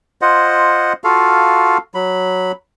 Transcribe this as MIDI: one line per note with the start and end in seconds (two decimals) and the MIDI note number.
0.21 0.93 65
0.21 0.93 72
0.21 0.93 75
0.21 0.93 78
1.04 1.78 65
1.04 1.78 66
1.04 1.78 69
1.04 1.78 77
1.95 2.52 54
1.95 2.52 83